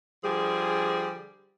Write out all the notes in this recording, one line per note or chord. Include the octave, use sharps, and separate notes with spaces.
D3 F3 G3 G#4